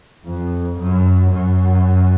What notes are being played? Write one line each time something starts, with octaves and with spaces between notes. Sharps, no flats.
F2
F#2
F#2